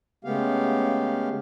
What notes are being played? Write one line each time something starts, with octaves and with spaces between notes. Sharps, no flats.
C#3 G#3 A3 B3 G4 F5